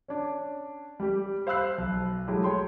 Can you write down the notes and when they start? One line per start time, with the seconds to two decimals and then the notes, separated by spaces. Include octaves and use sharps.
0.08 C#4 D4
1.00 G3 G4
1.47 C5 F5 B5 E6 F#6 C7
1.78 B1
2.28 F#3 G#3 A3 E4 G4
2.44 C#5 G5 C6